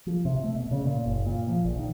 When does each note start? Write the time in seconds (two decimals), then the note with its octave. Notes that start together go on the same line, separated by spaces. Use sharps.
0.07 F3
0.25 C3
0.44 A3
0.56 B2
0.71 C#3
0.85 A#2
1.05 F#1
1.26 A#2
1.49 F3
1.64 A#1
1.79 D#3